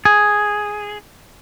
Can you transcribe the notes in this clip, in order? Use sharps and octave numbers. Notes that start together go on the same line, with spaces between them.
G#4